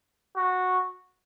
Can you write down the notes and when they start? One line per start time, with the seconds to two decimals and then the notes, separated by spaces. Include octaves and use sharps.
0.37 F#4